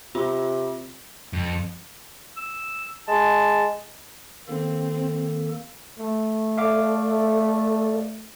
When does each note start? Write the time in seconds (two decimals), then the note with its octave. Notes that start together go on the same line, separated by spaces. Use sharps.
0.15 C3 F4
1.33 F2
2.37 E6
3.08 G#3 A5
4.48 D#3 A#3 C4 A4
5.99 A3
6.57 A4 D5 E5 F5 D6